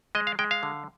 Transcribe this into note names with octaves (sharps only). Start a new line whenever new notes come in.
G#3 D#5
F5
G#3 G5
F5
D3